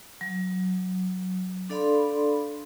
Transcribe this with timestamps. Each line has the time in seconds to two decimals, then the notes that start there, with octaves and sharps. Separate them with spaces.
0.21 F#3
1.69 D4 A4 D5 F5 B5 C6